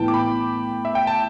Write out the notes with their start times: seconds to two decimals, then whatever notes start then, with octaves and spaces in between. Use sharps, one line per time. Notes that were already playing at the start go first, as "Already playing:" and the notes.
Already playing: A2 E3 B3 E4 G5 A5
0.08 D6
0.14 B5
0.85 E5
0.95 G5
1.07 A5